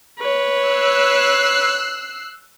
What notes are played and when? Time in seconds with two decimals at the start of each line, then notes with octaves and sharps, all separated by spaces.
0.19 B4 C#5
0.63 E6 F#6 C7